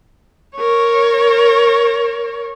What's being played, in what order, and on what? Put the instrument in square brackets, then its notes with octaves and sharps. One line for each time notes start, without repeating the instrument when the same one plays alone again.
[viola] A#4 C#5